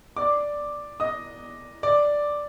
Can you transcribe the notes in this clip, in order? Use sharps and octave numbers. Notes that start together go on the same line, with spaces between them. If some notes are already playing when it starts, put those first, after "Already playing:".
D5 D6
D#5 D#6
D5 D6